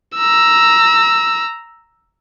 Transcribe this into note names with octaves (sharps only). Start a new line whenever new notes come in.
A#5 E6